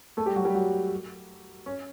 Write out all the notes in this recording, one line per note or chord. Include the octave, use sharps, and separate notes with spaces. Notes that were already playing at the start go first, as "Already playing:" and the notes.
A3 A4
G3 G4
F#3 F#4
G3 G4
F#3 F#4
C#4